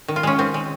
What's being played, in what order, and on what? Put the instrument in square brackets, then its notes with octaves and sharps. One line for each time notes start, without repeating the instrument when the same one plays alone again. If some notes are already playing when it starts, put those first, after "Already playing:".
[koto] D#3
F4
G#3 C#4
D#3 C4
G#3